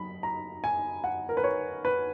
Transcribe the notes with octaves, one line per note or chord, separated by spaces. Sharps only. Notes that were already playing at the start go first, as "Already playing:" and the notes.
Already playing: F#3 B5
A#5
G#5
F#5
A#4
B4
C#5
B4